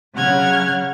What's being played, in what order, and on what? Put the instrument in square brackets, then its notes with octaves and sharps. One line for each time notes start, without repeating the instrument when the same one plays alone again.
[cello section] C#3 F#3 [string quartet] F#5 F6 G#6